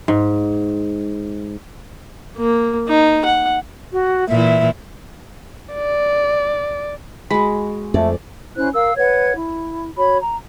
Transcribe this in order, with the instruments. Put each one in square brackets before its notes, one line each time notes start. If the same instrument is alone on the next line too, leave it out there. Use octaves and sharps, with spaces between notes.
[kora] G#2
[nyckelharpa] A#3
D#4
F#5
[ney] F#4
[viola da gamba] A#2 E3 E4 [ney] E5
[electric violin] D5
[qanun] G#3 F#4 [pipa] B5
[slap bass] F2 [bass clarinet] A3 [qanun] D5
[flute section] C#4 E4 C5 F#6
A#4 F5 E6
B4 C#5 F#5 G#6
E4
F#4 C#5 B5
A#5